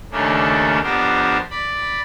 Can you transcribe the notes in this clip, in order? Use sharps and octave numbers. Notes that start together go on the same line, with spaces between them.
D#2 C#3 A3 A#3 C#4 D4
F2 B3 D4 G4 A#4 C5
D5 B5